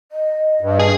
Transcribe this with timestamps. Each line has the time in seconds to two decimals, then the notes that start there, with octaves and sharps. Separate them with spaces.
0.12 D#5
0.61 G2
0.80 G#4